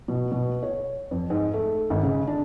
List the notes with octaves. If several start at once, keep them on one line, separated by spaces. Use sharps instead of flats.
B2
B2
C#5
F2
G#2
A3
G#1
C#3
D4